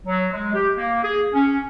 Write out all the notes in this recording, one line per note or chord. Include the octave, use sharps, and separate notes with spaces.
F#3
G#3
G4
A#3
G#4
C#4